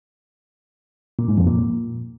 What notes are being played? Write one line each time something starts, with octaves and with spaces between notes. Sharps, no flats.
A#2
G#2
F2
A#2